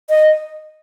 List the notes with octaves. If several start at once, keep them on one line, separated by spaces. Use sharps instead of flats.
D#5